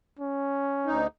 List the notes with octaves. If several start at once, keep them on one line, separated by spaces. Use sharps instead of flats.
C#4
D2 D#4